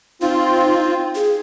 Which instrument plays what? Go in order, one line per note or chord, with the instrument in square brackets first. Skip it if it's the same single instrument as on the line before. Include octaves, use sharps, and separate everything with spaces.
[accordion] C4 F4 [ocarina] D#4
[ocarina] G#4